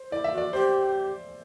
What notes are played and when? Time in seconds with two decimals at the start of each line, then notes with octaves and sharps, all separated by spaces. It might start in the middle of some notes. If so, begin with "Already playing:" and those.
Already playing: C5
0.12 E4 D5
0.24 E5
0.32 F#4
0.38 D5
0.53 G4 C5